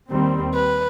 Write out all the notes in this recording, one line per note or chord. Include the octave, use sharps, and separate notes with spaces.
D#2 D#3 G3 C4
B4